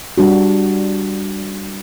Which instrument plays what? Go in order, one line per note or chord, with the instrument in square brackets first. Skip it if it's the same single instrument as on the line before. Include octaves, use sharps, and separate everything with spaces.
[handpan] G3 D4 F#4